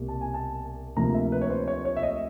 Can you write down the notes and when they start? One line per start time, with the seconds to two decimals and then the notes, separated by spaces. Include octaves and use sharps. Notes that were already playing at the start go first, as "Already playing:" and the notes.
Already playing: C2 B2 G3 A#3
0.08 A5
0.21 G#5
0.34 A5
0.96 D2 C3 F3 A#3 A#5
1.14 E5
1.32 B4
1.41 C#5
1.50 C5
1.68 C#5
1.85 C#5
1.96 E5
2.03 D#5